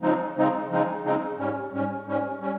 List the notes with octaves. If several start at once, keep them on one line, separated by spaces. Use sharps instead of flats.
C#3 F3 G#3 C4 D#4
C#3 F3 G#3 C4 D#4
C#3 F3 G#3 C4 D#4
C#3 F3 G#3 C4 D#4
G#2 G3 C#4
G#2 G3 C#4
G#2 G3 C#4
G3 C#4